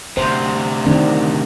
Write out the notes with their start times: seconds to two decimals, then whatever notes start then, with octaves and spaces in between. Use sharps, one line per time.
0.17 D2 C3 C5
0.86 D#3 C4 D4